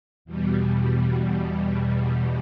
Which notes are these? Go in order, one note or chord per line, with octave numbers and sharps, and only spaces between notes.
E2 B2 G3